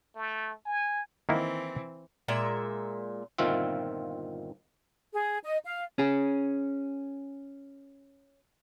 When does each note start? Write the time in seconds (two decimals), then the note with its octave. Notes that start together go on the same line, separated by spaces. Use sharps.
0.15 A3
0.66 G#5
1.29 D#3 E3 A#3 C4 E4
2.28 A#2 G#3 E5
3.38 G1 A#2 D#3 C4 F4 E5
5.13 G#4
5.43 D#5
5.64 F5
5.98 C#4 G#4